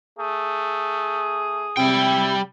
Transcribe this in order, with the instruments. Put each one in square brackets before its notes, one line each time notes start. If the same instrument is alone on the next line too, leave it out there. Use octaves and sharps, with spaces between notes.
[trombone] A3 [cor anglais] G#4
[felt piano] C3 [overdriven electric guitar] G3 G5 [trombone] E4